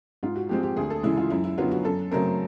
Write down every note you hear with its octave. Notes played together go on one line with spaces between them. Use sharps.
G#2 F4
F#4
F3 G#3 C4 G4
G4
D2 G#4
A4
C#3 E3 G#3 E4
F4
F#2 E4
E4
D3 F#3 B3 F4
F#4
F#2 A4
C#3 F#3 A3 C4 A#4